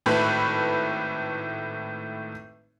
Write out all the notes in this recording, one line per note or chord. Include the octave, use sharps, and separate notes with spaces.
G#1 A2 A3 B4 B5